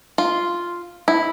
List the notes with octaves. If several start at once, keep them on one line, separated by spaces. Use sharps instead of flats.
F4
E4